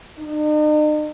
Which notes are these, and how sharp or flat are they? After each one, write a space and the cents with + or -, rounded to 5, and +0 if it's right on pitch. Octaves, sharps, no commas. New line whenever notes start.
D#4 -45